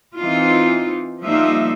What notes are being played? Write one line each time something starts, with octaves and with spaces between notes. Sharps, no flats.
E3 C4 D#4 F4
F3 G3 A#3 D#4 F4 E5